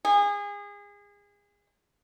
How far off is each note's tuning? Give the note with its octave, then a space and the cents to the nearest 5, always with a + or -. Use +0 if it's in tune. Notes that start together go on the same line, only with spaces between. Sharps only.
G#4 -30